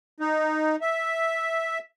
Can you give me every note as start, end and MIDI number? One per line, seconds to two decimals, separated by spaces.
0.20 0.76 63
0.81 1.79 76